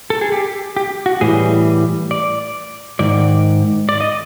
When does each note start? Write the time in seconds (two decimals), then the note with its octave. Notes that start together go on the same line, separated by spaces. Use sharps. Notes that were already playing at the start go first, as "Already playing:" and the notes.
0.10 A4
0.21 G#4
0.32 G4
0.77 G4
1.06 F#4
1.21 A2 E3 G3 G#4
2.11 D5
2.99 G#2 D#3 D5
3.89 D5
4.01 D#5